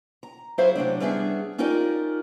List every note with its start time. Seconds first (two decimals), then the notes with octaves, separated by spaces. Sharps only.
0.23 A#5
0.58 F#3 E4 G#4 C5 E5 F5
0.75 C3 F#3 A3 D4
1.00 G3 B3 C#4 D4 G#4 E5
1.58 C#4 D#4 F4 G4 A#4 D5